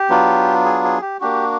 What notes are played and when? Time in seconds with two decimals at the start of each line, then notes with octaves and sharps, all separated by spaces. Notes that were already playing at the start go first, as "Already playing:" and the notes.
Already playing: G4
0.10 F#3 B3 D4 F4
0.65 G#4
0.84 G#4
1.02 G4
1.20 A#3 D4 F#4 G4